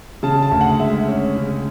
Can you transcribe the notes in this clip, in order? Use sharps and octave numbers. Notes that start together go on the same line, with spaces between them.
C#3 A5
A5
D2
F#5
G#3 E5
C#4
C#3